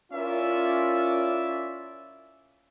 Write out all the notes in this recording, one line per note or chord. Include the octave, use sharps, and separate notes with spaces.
C#4 E4 F4 A#4 D5 E5